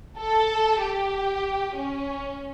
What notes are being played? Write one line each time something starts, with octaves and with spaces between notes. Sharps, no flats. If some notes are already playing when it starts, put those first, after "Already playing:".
A4
G4
C#4